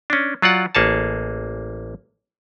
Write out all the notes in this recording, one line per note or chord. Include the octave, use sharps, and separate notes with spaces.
C#4 D4
F#3 F4 D5 F#5
A1 A#3 G#4 C#5 A5